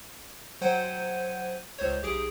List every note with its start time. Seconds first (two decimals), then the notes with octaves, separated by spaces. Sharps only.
0.61 F#3 C5 F#5 G5 G#6 D#7
1.78 C#2 C5 C#5
2.02 B1 G4 G#4 D7